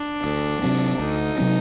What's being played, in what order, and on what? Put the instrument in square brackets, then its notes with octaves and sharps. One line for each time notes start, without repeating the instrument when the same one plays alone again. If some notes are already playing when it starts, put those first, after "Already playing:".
Already playing: [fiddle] D4
[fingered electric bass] D2
C3 F#3 C4
[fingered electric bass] D2 [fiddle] D#4
[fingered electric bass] C3 F#3 C4